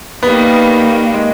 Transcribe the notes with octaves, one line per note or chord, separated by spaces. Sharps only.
D#3 G3 A#3 B3
G#3